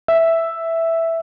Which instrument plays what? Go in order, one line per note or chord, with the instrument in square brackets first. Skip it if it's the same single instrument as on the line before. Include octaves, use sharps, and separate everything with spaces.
[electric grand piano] E5